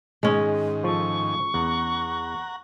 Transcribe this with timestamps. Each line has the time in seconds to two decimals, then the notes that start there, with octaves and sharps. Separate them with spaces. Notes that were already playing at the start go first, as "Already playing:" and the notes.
0.23 G#2 D#3 G#3 C#4
0.84 F3 A4 C#6
1.54 E2 F#5 A#5